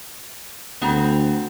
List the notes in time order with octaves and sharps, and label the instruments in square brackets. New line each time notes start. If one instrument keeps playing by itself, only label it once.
[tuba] D2 [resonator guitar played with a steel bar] B3 C4 A#5